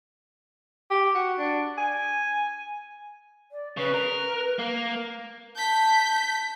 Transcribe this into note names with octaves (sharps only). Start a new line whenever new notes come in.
G4
F#4
D4
G#5
D5
C#3 B4
A#4
A#3
A5 G6 B6